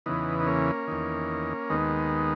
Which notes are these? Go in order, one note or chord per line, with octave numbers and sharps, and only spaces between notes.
E2 C#3 E3 B3 D#4
D#4
A#3 C#4
E2 D#3
D#2 D#3 G#3 B3